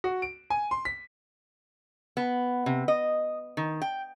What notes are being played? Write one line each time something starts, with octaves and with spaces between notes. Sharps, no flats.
F#4
D7
G#5
C6
B6
B3
C3
D#5
D#3
G5